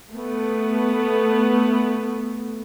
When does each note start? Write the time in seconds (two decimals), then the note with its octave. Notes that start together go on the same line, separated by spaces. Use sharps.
0.12 A3 B3